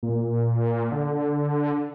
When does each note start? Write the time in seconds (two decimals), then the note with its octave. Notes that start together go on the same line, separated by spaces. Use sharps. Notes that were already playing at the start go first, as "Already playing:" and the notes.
0.03 A#2
0.92 D3